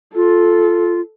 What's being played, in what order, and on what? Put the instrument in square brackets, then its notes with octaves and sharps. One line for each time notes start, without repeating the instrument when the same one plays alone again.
[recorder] F4 [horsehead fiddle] A4